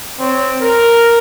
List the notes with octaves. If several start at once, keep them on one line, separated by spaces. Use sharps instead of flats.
C4 C#5
A#4